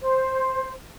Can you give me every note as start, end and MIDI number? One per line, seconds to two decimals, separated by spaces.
0.01 0.72 72